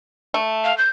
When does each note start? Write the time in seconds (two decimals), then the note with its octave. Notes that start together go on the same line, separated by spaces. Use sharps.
0.34 A3
0.64 F5
0.78 G6